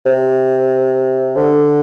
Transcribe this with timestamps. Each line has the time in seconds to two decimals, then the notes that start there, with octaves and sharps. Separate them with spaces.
0.06 C3
1.36 D3